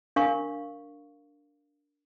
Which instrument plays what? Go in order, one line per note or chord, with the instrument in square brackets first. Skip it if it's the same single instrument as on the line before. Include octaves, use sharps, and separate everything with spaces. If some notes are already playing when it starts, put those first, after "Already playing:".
[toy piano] D4 A#4 F5 C#6